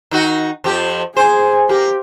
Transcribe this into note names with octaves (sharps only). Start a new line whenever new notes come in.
D#3 D#4 F#4
F2 F3 G4
G#4 C5 G#5
A#3 G4